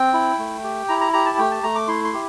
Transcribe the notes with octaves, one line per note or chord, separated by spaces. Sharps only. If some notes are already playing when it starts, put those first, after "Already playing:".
Already playing: C4 G5
E4
A3
G4
E4 A#5
A#5
G4 A#5
A5
A3 G5
A5
A3 A#5
D6
E4 C6
C6
G4